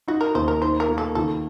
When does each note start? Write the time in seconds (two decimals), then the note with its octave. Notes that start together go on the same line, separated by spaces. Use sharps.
0.08 D#4 F#4
0.21 A#4
0.35 D#2 C5
0.48 A#4
0.62 D#4 C5
0.80 A#4
0.88 A#3
0.98 A4
1.15 D#3 A4